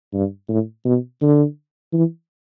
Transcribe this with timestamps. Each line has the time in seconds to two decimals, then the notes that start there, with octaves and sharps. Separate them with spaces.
0.14 G2
0.49 A2
0.85 B2
1.22 D3
1.93 E3